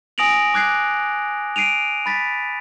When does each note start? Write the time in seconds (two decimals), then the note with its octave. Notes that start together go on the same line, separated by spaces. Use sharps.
0.18 G#5 D#6 A#6 D7 F7 F#7
0.54 D6 F#6 G#6 C7
1.56 C7 D7 D#7 F7
2.06 B5 A6 B6